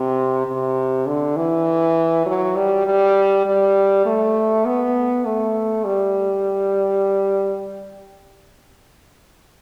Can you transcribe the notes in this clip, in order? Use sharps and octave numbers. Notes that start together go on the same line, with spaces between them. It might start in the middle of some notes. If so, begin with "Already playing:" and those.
Already playing: C3
C3
D3
E3
F#3
G3
G3
G3
A3
B3
A3
G3